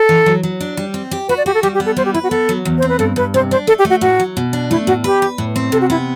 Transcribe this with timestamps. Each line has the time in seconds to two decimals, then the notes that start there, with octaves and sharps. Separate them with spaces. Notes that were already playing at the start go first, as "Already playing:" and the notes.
Already playing: A4
0.09 E3
0.26 F#3
0.43 F#3
0.61 D4
0.77 G3
0.94 C4
1.11 G4
1.28 F#4 B4
1.38 D5
1.46 F#4 G4
1.54 A4
1.62 G3 G4
1.75 G4
1.80 B3
1.86 A4
1.97 G3 C5
2.05 G4
2.13 E4 B4
2.23 F#4
2.31 B3 A4
2.49 F#3
2.65 E2
2.78 C4 C5
2.89 B4
2.99 G2 A4
3.16 G2 B4
3.34 C3 C5
3.51 D4 C5
3.67 A3 A4
3.79 G4
3.85 A3
3.90 F#4
4.01 A2 F#4
4.20 F#3
4.37 B2
4.53 D4
4.70 A3 E4
4.87 A2 F#4
5.04 G4 B4
5.22 B4
5.38 A2
5.56 C4
5.72 C3 A4
5.81 F#4
5.90 B3 E4